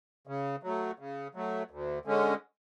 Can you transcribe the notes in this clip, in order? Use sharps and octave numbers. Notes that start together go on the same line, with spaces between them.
C#3
F#3 A3
C#3
F#3 A3
D2
D3 G#3 C#4